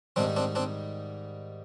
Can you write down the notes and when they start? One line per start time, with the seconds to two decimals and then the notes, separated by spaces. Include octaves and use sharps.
0.16 G#2 D#3 G3 C4 D4
0.36 C4 D4
0.55 C4 D4